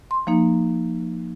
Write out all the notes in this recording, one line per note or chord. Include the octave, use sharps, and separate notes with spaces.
C6
F3 A#3 D#4